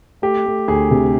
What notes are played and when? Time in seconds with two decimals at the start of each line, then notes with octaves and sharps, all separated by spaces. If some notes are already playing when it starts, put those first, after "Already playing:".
0.22 A3 G4
0.46 A3
0.68 D2 G#4
0.91 C3